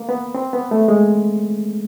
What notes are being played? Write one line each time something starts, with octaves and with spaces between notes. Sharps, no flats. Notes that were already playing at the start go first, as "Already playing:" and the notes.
Already playing: A#3
B3
C4
B3
A3
G#3